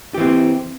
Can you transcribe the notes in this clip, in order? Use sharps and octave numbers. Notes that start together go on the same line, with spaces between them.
E3 C4 G4